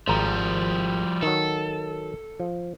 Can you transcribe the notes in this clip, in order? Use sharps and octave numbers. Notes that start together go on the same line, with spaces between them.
G#1 F3 G3 A#5
D#3 F#3 A4
F3